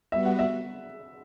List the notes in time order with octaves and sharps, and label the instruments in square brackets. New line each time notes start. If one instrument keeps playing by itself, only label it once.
[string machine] G3 B3 F#4 [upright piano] E5
[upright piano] F#5
E5